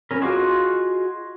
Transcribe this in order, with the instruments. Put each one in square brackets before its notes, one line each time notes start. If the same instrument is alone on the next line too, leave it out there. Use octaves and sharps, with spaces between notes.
[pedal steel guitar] C#4 A#4
F4 F#4 G#4 D#5 D6